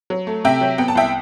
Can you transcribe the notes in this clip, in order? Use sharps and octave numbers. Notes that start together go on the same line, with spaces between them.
F#3
A3
C3 E5 G5
F#3
B3 G5
A5
C2 E5 G5